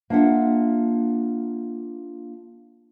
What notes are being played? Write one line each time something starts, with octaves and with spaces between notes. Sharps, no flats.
A#3 D4 F4 E5 F#5